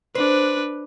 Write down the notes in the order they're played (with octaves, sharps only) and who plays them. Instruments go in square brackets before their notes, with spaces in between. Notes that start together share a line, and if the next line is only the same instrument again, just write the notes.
[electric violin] D4 B4 [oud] C5